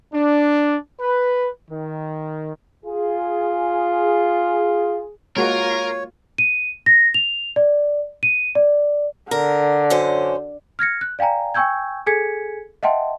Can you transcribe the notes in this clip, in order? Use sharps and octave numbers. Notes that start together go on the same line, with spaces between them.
D4
B4
D#3
F4 G#4
G#3 A#3 F4 F#4 A#4 C#5
D#7
A#6
F7
D5
D#7
D5
D3 A#4
F#2 C#4 C5
F6 G#6 A#6 C#7
F#6
D5 F5 G5 G#5 A#5
G5 G#5 C#6 E6 G6 G#6
G#4 A4 G#5 G#6 B6 C#7
D#5 E5 F#5 G5 A5 C6